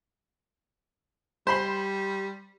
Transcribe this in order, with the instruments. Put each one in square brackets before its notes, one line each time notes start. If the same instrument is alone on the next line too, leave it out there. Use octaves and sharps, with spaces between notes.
[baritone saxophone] G3 [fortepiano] C5 B5 C6